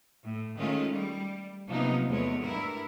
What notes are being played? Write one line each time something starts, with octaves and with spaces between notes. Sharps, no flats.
A2
D#3 G#3 A3 C#4 F4
G3
C3 F3 F#3 A#3 B3 D#4
E2 G#3 A3 B3 C#5
G2 E4 A#4